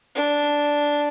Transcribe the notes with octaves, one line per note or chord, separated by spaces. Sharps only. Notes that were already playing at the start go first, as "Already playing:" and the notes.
D4